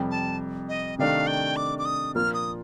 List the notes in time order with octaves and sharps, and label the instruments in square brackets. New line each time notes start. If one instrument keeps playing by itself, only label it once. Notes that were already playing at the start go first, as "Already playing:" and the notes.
Already playing: [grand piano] F2 C3 G3
[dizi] A5
D#5
[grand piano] C3 D#3 A3 D4 [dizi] F5
[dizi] G5
D6
D6
D#6
[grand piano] A#2 F3 A#3 F4 [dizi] F6
[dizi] D#6